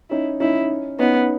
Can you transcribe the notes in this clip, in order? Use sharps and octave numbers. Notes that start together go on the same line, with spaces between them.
C#4 D#4 E4
C#4 D#4 E4
B3 C#4 D#4